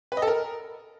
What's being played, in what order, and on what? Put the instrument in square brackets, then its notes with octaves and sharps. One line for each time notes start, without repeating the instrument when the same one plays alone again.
[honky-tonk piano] B4
D#5
A4
A#4